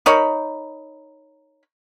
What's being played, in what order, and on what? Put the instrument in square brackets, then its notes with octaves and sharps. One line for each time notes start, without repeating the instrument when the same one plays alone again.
[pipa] D#4 A#4 C#5 B5